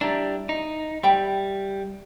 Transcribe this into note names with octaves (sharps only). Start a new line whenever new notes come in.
G3 D4 E4 A#5
D#4
G3 E5 G5 B5